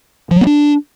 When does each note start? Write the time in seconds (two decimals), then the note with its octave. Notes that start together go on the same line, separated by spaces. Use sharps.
0.31 F3
0.36 F#3
0.41 B3
0.47 D4